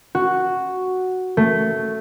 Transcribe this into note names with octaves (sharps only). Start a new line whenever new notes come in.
F#4
A3